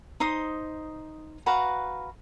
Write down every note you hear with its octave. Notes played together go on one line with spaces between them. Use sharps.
D#4 C5 D#6
F#4 B4 F5 A#5